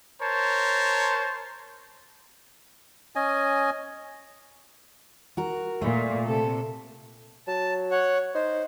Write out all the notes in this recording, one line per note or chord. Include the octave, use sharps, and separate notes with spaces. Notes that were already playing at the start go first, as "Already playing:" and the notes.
A#4 C5 C#5 A5
C#4 D#5 G#5
F#4 A#4
A#2 A3
C3 A4
F#3 A5
C#5 F#5
D#4 C5